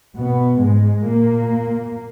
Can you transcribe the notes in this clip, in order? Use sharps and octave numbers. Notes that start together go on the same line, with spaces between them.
B2 B3
G#2 G#3
A#2 A#3